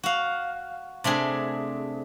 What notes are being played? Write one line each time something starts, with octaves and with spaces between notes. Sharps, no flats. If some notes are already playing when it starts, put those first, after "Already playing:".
F#4 F5
C3 A3 D4 G#4